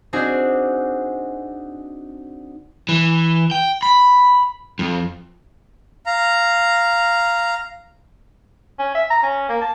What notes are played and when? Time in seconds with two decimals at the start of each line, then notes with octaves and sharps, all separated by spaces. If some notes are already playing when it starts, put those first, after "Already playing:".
0.13 C4 D4 D#4 F#4 G#4
2.89 E3
3.51 G5
3.83 B5
4.79 F2
6.06 F5 A#5
8.79 C#4
8.94 E5
9.10 A#5
9.23 C#4
9.49 A#3
9.61 A5